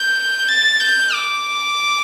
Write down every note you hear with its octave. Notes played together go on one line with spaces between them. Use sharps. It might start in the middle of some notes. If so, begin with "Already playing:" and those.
Already playing: G6
A6
G6
D6